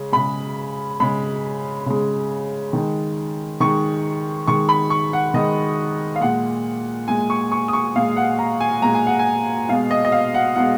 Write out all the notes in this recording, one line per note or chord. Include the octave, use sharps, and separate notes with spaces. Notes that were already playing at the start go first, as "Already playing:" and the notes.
Already playing: C#3 G#3
C#3 G#3 B5
C#3 G#3 B5
C#3 G#3
D#3 G#3
D#3 G#3 C#6
D#3 G#3 C#6
B5
C#6
F#5
D#3 G#3 D#5
F5
A#2 G#3 F#5
A#2 G#3 G#5
C#6
C#6
D#6
C#6
A#2 G#3 F5
F#5
A#5
G#5
A#2 G#3 A#5
G#5
F#5
G#5
B2 G#3 F5
D#5
D#5
F5
F#5
B2 G#3 F#5